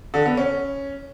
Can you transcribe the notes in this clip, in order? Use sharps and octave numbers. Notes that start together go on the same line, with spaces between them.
D3
B3
C#4